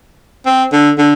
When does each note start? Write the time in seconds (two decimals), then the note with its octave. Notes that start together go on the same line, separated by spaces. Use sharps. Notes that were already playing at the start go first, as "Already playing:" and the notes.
0.46 C4
0.72 D3
0.98 D3